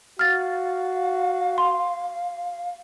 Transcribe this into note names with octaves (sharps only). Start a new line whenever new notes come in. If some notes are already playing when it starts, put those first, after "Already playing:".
F#4 F5 F6 A6
C6